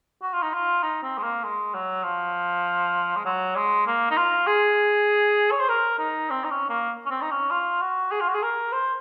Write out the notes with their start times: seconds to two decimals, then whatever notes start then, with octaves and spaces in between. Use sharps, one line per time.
0.22 F#4
0.33 F4
0.43 D#4
0.54 F4
0.83 D#4
1.03 C4
1.18 G#3
1.23 A#3
1.44 G#3
1.74 F#3
2.04 F3
3.16 G#3
3.25 F#3
3.56 G#3
3.87 A#3
4.11 D#4
4.17 F4
4.47 G#4
5.52 C#5
5.61 C5
5.69 A#4
5.99 D#4
6.30 C4
6.44 D#4
6.51 C#4
6.70 A#3
7.06 C#4
7.11 C4
7.22 D#4
7.31 C#4
7.51 F4
7.82 F#4
8.11 G#4
8.21 F4
8.28 F#4
8.35 G#4
8.43 A#4
8.72 C5